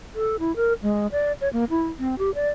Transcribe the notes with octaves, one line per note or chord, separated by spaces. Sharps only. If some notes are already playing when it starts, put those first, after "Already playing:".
A4
E4
A#4
G#3
D5
C#5
A#3
E4
C4
G4
D5